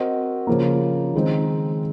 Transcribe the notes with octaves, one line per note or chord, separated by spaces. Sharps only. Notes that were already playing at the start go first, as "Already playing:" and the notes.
Already playing: C4 F#4 A#4 D#5
C#3 F3 A#3
D#3 G#3 C4 D#4